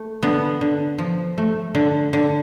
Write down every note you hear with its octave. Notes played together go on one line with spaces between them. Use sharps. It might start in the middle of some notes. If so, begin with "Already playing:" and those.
Already playing: A3
D3 B3
D3
F3
A3
D3
D3